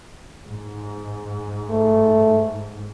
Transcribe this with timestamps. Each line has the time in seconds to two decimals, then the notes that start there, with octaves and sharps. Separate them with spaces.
0.45 G#2
1.70 A3